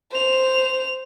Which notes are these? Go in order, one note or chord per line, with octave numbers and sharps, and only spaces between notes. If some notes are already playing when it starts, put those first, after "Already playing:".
C5 F7